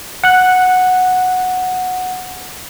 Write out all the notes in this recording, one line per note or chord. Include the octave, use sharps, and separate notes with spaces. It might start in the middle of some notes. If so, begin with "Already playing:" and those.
F#5 F#6